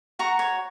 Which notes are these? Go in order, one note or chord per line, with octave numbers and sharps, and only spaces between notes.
F#4 A#5 C#6
C#5